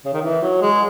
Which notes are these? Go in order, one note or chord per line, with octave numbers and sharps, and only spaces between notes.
C#3
D#3
E3
F#3
G#3